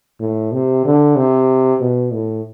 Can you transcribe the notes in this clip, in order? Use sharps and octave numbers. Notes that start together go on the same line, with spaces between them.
A2
C3
D3
C3
B2
A2